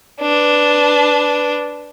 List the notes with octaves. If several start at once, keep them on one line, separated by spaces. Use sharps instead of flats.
D4 B4